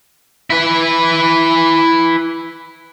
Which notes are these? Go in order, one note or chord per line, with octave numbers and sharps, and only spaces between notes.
E4 B4